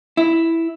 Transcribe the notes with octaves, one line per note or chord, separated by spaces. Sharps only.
E4